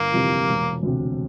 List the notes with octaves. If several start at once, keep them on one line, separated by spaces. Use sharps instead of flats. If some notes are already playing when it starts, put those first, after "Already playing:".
Already playing: G1 A#3
F2 C3 E3 G3
E1
D2 C3